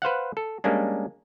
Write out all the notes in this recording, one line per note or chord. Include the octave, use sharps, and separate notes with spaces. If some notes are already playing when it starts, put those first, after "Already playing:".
B4 C5 F5 F#5
A4
G3 G#3 A#3 C#4 D4